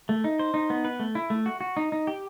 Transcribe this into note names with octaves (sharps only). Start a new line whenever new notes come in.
A3
D#4
C5
D#4
B3
B4
A3
E4
A3
F#4
F#4
D#4
D#4
G4